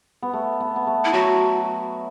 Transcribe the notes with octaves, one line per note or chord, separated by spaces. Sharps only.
B3
A3
B3
B3
A3
E4
F#3 F#4